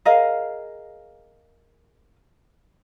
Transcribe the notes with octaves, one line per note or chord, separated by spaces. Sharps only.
G#4 A#4 D#5 F5